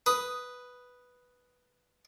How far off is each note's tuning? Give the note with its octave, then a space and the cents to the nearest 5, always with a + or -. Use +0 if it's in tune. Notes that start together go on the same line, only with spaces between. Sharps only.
B4 +0 D#6 +0